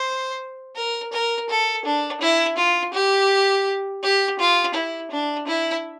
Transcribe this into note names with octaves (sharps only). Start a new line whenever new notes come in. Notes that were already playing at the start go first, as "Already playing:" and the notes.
Already playing: C5
A#4
A#4
A4
D4
E4
F4
G4
G4
F4
E4
D4
E4